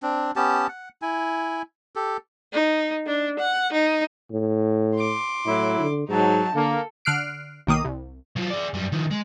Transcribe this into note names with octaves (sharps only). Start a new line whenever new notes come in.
C4 D4
B3 C#4 G4 A5
F#5
E4 G#5
G4 A4
D#4
D4
F#5
D#4
A2
C6 D6
A2 F#3 E4
D3
G#2 F#3 D#4 A5
D3 A#3 A4
D3 F6 F#6 C7 D7
B1 D#3 A#3 D#6
C2
F#3 F4
G#4 D5
F#2 G3
D#3 F3
G#3